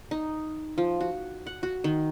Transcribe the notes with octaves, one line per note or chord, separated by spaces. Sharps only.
D#4
F3
F#4
F#5
F#4
D#3